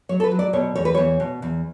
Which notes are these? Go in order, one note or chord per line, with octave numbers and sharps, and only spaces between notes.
F#3 C#5
A4
B4
F#3
D5
B2 C#5
E2 C#5
B4
E2 C#5
B2
E2